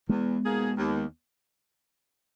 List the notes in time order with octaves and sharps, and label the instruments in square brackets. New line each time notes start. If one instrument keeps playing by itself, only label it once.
[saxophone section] E2 [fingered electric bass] G#3 B3
[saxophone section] B2 A#3 D#4 G#4
D#2